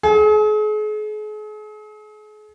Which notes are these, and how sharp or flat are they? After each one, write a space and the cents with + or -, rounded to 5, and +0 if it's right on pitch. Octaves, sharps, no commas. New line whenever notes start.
G#4 +40